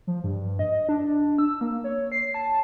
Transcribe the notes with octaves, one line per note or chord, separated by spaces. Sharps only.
F3
G2
D#5
D4
E6
A#3
C#5
C7
A5